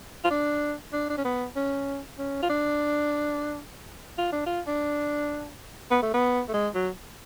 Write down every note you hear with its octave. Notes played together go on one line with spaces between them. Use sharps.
F4
D4
D4
D4
C#4
B3
C#4
C#4
F4
D4
F4
D4
F4
D4
B3
A3
B3
A3
G#3
F#3